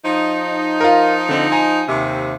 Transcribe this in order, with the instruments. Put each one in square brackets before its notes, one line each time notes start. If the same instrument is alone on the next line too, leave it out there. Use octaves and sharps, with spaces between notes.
[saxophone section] F3 D#4
[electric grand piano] F4 A#4
D3 C4
G#5 A#5
[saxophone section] D#2 C3